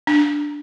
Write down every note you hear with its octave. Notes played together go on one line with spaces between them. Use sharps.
D4